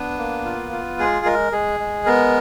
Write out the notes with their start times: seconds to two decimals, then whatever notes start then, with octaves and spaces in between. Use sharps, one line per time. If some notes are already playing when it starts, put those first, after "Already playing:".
Already playing: B3 D4 B4
0.18 A#3
0.45 F4
0.72 F4
0.99 G#3 G#4
1.26 G#3 A#4
1.52 G#3 G#4
1.80 G#3
2.06 B3 A#4